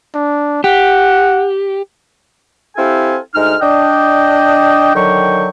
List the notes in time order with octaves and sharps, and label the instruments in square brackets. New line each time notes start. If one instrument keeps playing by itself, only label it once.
[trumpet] D4
[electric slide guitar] G4 [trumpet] F#5
[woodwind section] C4 E4 G4 A4 F5 G#5
D2 G#3 D#4 F6
D4 D#5 G5
D3 D#3 F#3 G5 C#6